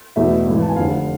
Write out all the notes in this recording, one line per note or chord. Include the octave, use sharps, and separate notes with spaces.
E2 B2 A3 E5
G#1 G#2 E3
A5
G#5
F1 F2 D3 F5